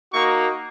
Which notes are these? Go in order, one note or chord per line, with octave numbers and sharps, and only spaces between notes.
A#3 D#4 F#4 C#6